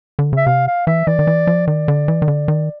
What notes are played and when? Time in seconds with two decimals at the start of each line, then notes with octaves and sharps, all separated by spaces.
0.19 D3
0.33 C#3 E5
0.46 C3 F5
0.67 F5
0.87 E3 E5
1.07 E3 D5
1.19 D#3
1.27 E3
1.47 F3
1.67 D#3 D5
1.88 D3
2.08 E3
2.22 D#3
2.28 D3
2.48 D#3